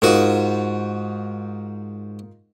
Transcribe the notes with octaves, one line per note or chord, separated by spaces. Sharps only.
G#2 D#4 F4 F#4 A#4